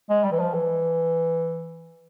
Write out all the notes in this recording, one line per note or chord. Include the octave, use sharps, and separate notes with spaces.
G#3
G3
E3
F3
E3